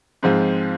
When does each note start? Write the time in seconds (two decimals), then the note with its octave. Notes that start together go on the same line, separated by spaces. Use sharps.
0.23 G#2 F3 G#3 C4 F4